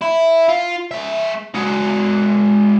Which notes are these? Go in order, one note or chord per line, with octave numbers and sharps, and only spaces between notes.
E4
F4
G#3 E5
G#3 F#4